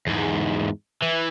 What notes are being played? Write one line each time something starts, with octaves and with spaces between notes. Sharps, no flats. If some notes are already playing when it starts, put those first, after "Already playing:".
E2 G#2
E3